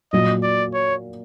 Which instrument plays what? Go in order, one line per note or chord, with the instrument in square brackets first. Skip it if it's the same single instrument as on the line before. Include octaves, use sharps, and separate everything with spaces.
[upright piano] A#2 F#3 A#3 [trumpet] D#5
[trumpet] D5
C#5